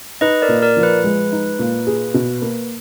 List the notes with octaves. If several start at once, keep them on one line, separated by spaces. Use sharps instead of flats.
D#4 B4 D#5
A#4 D5
A#2
A#4 D5
F3
B4
G#3
D#4
A#2
G#4
B2
A#3